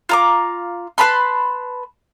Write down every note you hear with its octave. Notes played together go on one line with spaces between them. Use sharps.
F4 A#5 D6
B4 A5 B5 C6